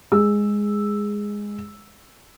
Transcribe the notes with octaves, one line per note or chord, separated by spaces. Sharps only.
G#3 G#4 E6